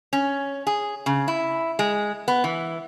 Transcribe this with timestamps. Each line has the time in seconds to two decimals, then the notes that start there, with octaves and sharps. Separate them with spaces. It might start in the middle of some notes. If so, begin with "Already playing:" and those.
0.13 C#4
0.67 G#4
1.06 C#3
1.28 E4
1.79 G#3
2.28 B3
2.44 E3